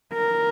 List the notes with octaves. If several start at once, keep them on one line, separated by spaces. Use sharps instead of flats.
A#4